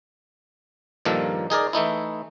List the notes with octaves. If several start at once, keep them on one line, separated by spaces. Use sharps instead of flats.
G2 A#2 D#3 F3 A#3 A4
D#4 G#4 A#4 D5
E3 A3 D#4 E4